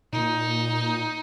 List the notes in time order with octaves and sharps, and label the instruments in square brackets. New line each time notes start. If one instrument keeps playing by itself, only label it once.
[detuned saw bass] A#2 [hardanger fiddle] D#4